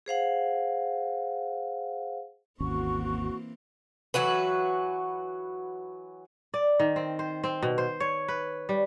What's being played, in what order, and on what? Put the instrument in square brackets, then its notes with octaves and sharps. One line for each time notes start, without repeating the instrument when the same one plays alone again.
[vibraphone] G#4 C5 F5 F#5
[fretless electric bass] G#1 D#2 C#4 [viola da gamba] E3 A#3 C4 [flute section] F#4 C#6
[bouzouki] E3 F#3 F#4 B4
[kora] D5
D#3
C4
C5
C4
B2
C5
C#5
B4
G3